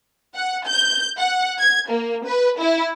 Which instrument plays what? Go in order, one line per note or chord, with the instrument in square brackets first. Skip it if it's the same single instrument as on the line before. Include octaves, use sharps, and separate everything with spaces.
[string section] F#5
G6
F#5
G#6
A#3
B4
E4